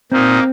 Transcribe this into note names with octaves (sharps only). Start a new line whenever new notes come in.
A#2 A#3 C4 D#4